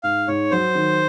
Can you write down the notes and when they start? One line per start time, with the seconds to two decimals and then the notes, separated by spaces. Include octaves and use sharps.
0.03 G#2 F5
0.28 G#2 C#5
0.51 F#3 C5
0.75 D#3